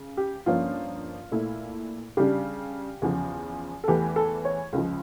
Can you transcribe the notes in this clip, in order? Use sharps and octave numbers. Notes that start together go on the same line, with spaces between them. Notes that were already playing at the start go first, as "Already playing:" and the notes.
Already playing: C#3
G4
G2 F3 A#3 C#4 F4
A#2 A3 E4
C#3 G3 D4 G4
E2 C#3 F3
A4
E2 E3 A3 G4
A4
C#5
C#2 C#3 F3